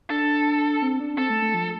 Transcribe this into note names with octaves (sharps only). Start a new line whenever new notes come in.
D4 A4
C4
D4
C4 A4
A3
A3
F3